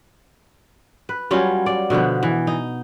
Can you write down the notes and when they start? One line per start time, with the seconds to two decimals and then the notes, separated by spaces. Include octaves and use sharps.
1.09 B4
1.31 F#3 G3 C#4 F4
1.66 D5
1.90 B2 D3 F3 B3
2.23 E3
2.47 D#4